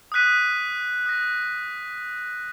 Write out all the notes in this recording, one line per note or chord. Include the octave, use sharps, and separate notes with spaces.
D#6 F#6 B6 D#7
D#6 A#6 D#7